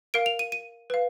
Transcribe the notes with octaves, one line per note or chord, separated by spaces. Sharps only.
A#4 F5 D7
F7
D#7
D#7
B4 F5